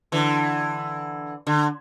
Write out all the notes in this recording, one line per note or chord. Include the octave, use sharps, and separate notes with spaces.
D3 E3
D3